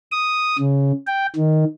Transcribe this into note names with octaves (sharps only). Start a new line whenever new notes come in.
D#6
C#3
G5
D#3